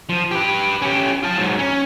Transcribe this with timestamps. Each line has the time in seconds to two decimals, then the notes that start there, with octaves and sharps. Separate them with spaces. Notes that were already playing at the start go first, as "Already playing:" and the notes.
0.09 F3
0.31 G4 B4
0.82 C#4 G4
1.23 F4 A5
1.37 G#2 F#3
1.59 C#4